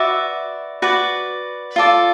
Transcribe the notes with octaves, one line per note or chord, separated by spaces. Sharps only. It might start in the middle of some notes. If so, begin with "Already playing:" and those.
Already playing: F#4 B4 D5 E5
F#4 B4 D5
F4 A4 D5